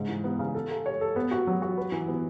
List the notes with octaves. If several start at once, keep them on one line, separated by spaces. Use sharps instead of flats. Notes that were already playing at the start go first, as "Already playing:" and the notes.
Already playing: G#2 C#3
E3
B3
C#3
A4
A4
C#5
A4
B3
F#4
F#3
F#4
B4
E3
B3